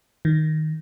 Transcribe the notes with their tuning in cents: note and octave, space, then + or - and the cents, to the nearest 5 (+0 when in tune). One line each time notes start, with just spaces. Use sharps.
D#3 +0